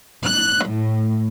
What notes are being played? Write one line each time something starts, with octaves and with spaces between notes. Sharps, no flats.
F#6
A2